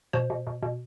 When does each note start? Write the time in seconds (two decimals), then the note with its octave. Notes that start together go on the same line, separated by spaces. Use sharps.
0.13 B2 C5
0.30 B2
0.47 B2
0.62 B2